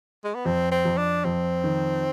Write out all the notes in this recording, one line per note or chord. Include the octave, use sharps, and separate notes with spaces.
G#3
B3
F2 C4
C4
F2
D4
F2 C4
D#3